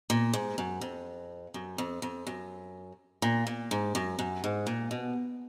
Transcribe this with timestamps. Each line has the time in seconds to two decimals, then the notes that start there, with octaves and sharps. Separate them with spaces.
0.10 A#2
0.33 G#2
0.58 F#2
0.81 F2
1.54 F#2
1.78 F2
2.02 F2
2.27 F#2
3.22 A#2
3.47 A#2
3.71 G#2
3.95 F#2
4.19 F#2
4.44 G#2
4.67 A#2
4.91 B2